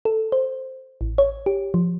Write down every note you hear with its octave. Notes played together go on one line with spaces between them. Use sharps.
A4
C5
A1
C#5
G4
F3